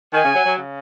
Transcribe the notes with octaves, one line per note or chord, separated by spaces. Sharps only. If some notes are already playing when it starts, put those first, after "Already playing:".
D#3 G#5
C#3
F#3
F#3
C#3